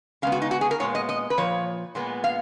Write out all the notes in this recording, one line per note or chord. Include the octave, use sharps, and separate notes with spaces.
C#3 G#3 B3 F5
F#4
D#4
F#4
G#4
A#4
A#2 G#3 B3 C#5
D#5
D#5
B4
A#2 F3 C#5
A#2 G#3 B3
F5